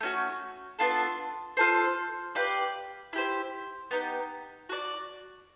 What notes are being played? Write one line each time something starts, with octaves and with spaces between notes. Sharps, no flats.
A3 C#4 F#4
B3 D4 F4 A4
F4 A4 C5
G4 B4 D5 F5
E4 G4 C5
B3 D#4 G4
F#4 A4 D5